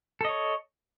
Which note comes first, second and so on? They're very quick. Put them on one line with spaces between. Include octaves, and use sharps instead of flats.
A4 D#5 C#5